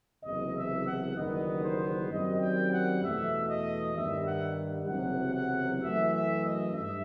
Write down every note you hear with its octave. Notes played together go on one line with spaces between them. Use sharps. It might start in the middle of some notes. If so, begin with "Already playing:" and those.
F#1 E2 C3 D#5
E5
F#5
F#1 E2 D#3 G3 B3 D#5
C5
F#2 D#3 G3 C4 D#5
G5
F#5
E2 B2 A3 E5
D#5
G2 D#3 G3 E5
F#5
F#1 E2 C3 F#3 F#5
F#5
F#2 E3 A3 E5
E5
D#5
G2 E5